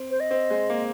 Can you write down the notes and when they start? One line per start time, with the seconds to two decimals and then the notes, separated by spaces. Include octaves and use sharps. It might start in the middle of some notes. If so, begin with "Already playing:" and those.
Already playing: C4
0.10 C5
0.20 D#5
0.31 C4
0.50 G#3
0.70 A#3